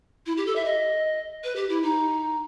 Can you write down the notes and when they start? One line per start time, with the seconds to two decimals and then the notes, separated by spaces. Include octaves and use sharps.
0.26 E4
0.37 G4
0.46 A4
0.55 E5
0.65 D#5
1.44 B4
1.56 G4
1.69 E4
1.83 D#4